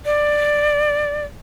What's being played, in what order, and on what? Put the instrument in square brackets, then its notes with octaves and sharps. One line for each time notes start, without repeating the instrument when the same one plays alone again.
[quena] D5